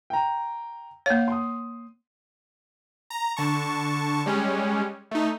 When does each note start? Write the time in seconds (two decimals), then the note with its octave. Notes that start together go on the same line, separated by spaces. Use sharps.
0.10 G5 A#5
1.06 A#3 C#5 F5
1.28 C6 D#6
3.10 A#5
3.37 D3 A5 C#6
4.26 G3 G#3 C#4
5.11 A3 D#4